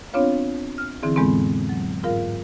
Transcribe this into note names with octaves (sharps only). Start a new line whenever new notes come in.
B3 C4 D4 F4 C#5 F5
F6
D3 E3 C4 E4 G#4
F2 A2 E3 G#3 B3 C4
F#3
G#2 F4 A#4 F5